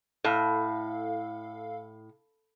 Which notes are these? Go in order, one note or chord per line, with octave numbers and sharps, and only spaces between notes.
A2 A4 F5